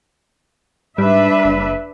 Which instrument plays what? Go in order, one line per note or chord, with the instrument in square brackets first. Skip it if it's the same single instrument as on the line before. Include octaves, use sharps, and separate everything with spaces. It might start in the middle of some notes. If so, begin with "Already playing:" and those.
[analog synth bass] G#2 [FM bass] G3 [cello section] D4 B4 E5
[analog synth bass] F#1